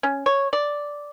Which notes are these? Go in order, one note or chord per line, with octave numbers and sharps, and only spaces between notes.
C#4
C#5
D5